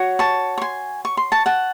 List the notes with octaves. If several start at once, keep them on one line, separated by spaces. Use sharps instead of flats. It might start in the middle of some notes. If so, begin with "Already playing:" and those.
Already playing: F#4 C#5
A5 C#6
C#6
G#5 C6
C#6
C6
A5 C#6
F#5 A5